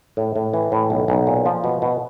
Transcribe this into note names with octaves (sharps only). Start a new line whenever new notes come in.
A2
A2
E3
A2
B1
B1
A#2
F3
B2
B2